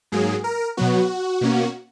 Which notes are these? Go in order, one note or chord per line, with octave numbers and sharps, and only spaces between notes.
G#2 F#3 A#3 G#4
A#4
B2 F#3 B3 F#4
B2 A#3 C#4